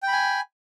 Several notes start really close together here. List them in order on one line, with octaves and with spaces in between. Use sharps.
G5 B5 G#5